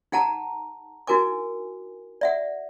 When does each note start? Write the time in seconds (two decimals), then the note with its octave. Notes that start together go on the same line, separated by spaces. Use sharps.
0.12 D#4 G#4 F#5 A5 A#5
1.07 D#4 E4 F#4 A#4 G#5 D6
2.21 D5 E5 F#5